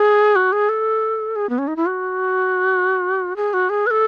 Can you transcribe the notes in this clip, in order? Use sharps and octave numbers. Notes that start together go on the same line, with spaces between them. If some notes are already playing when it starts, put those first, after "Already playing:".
Already playing: G#4
F#4
G#4
A4
G#4
B3
C#4
D#4
E4
F#4
G#4
F#4
G#4
B4
A4